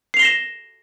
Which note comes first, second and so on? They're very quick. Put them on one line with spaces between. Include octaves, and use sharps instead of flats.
C7 F7 G7 A#6 E7